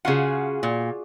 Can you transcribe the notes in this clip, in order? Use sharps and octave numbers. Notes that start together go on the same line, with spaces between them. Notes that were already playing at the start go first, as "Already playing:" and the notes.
C#3 F4 F#4 G#4 F#5
A#2